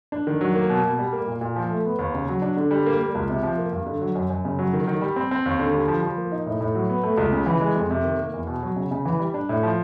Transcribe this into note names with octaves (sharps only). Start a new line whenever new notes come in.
D4
D#3
F#3
A#3
B2
B2
G3
A#3
A#2
A#2
F3
A3
B3
D#2
C#3
F#3
D4
D3
G3
A#3
A#3
C#2
C3
F3
A#3
G2
D3
F#3
F#2
F#2
C#3
F#3
D#3
D#3
G3
C4
C4
D#2
D3
G3
F3
F3
A#3
D#4
A2
A2
F#3
B3
A3
C#2
C#3
E3
G#3
F2
C3
D#3
A#3
E2
B2
F#3
C#3
C#3
E3
G3
D4
A2
F3